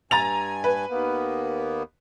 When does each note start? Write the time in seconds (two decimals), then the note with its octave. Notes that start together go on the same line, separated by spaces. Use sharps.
0.11 G2 G#5 A#5 A6 F7
0.64 B4
0.90 D#2 A#3 B3